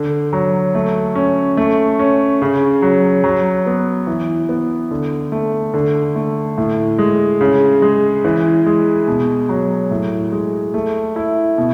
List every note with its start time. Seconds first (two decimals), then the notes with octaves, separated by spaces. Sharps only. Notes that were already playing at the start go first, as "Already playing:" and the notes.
Already playing: D3
0.33 F#3
0.75 A3
1.15 C#4
1.57 A3
1.99 C#4
2.42 C#3
2.82 F#3
3.24 F#3
3.66 B3
4.07 E3
4.49 B3
4.91 D3
5.32 A3
5.74 D3
6.16 A3
6.58 A2
6.99 G#3
7.41 C#3
7.82 G#3
8.24 E3
8.66 G#3
9.08 B2
9.49 F#3
9.91 A2
10.32 G#3
10.74 A3
11.16 E4
11.58 B2